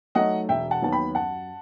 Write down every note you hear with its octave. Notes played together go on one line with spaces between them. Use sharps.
F#3 A3 D#4 D#5 F#5
E1 E5 G5
F#5 A5
D#2 D#3 F#3 B3 A5
G5 B5
F#2 F#5 A5